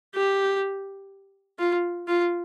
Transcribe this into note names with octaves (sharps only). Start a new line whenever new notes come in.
G4
F4
F4